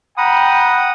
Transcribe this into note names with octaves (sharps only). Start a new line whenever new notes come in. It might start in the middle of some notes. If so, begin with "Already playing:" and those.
F#5 G5 A#5 B5 D#6